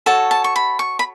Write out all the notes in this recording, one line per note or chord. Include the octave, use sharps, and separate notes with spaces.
F#4 A4 C#5 A5
A5
C#6
B5
C#6
B5